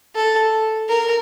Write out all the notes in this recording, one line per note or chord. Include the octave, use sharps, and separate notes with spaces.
A4
A#4